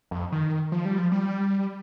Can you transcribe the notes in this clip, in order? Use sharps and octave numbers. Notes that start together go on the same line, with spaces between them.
F2
D#3
F3
G3
F3
G3